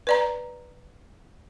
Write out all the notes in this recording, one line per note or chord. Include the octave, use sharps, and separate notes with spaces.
B4 D5 A#5